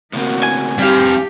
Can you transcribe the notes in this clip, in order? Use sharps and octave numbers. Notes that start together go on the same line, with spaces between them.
A2 C#3 A#3 C4 F#4
G#5
G3 C4 G4 F5